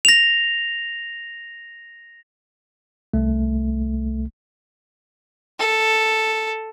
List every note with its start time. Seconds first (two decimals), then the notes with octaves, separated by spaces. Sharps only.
0.05 A#6 F7
3.13 C2 A3
5.59 A4